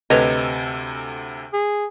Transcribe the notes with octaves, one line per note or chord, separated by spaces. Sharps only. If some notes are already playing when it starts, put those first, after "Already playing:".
D2 C3 A4 B4 C#5 D#5
G#4